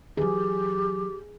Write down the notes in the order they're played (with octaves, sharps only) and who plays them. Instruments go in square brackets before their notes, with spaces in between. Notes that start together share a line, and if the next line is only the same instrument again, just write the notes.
[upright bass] E3 F#3 [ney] G4 [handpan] G#4